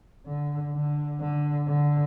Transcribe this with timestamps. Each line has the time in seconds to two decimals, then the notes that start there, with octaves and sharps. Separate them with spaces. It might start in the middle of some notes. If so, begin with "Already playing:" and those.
0.26 D3
0.74 D3
1.21 D3
1.68 D3